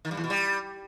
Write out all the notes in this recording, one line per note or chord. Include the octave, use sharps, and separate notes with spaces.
D#3
G2
E2
B2
G3